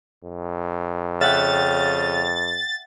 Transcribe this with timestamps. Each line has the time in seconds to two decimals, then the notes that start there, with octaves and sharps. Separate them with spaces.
0.24 F2
1.21 C#3 E5 F#5 G5 A6